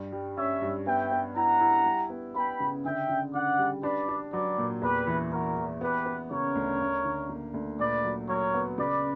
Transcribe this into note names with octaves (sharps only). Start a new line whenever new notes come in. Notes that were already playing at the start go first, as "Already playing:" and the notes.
Already playing: G2 G3
G3
C#4 C#5 E5
G2
B3 E5 G5
B3
E4 F#5 A#5
E4
G3
B3
B3 G5 B5
C#3
D3 E5 G5
D3
D3 D5 F#5
G3
D4 B4 D5
D4
F#3 B4 D5
A#2
E2 G4 B4
E3
E3 F#4 A#4
E3
B3 G4 B4
B3
C#3 A#4 C#5
D2
D2
D3
A#3
D2
A#2 B4 D5
F#3
F#3 A#4 C#5
B3
C#3 B4 D5